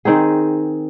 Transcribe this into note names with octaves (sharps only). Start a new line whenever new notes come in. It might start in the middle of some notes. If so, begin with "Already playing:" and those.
D#3 C4 D#4 G#4